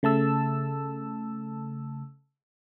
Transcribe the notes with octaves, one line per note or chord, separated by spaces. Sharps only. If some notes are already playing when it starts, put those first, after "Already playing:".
C#3 A3 A5 E6